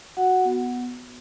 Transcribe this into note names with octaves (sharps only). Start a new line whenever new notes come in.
F#4 F#5
B3